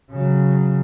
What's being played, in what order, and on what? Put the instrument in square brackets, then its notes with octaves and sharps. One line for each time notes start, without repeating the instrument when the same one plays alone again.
[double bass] C#3 F#3